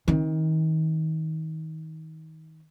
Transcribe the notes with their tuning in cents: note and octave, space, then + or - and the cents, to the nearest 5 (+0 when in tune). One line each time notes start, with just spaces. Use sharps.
D#3 +30 C4 +45